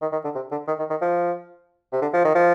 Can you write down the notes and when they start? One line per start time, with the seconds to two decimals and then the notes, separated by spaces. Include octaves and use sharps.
0.02 D#3
0.12 D#3
0.24 D3
0.35 C3
0.51 D3
0.67 D#3
0.79 D#3
0.90 D#3
1.01 F3
1.92 C3
2.02 D3
2.13 F3
2.25 D#3
2.35 F3